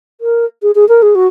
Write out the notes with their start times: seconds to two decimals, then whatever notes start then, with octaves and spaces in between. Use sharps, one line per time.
0.21 A#4
0.62 G#4
0.75 G#4
0.89 A#4
1.02 G#4
1.15 F#4